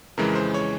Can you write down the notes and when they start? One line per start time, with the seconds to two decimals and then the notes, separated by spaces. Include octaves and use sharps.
0.18 F2 C#3 E3 G#3 A#4
0.35 C5
0.54 C#5